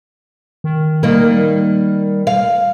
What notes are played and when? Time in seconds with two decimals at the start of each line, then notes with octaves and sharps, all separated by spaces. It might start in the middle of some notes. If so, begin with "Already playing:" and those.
0.64 D#3
1.03 D#3 G3 A#3
1.29 G3
2.27 F5